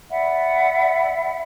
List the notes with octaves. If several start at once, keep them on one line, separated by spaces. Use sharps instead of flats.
D5 E5 F#5 B5